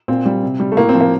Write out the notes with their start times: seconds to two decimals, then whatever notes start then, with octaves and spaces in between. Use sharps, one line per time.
0.08 A#2 C4
0.25 G3
0.43 C3
0.60 G3
0.72 A3
0.77 A2 A#3
0.89 C4
0.94 F3
1.01 A#3